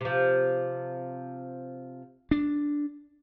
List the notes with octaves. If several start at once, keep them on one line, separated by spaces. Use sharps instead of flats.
C3 F3
D4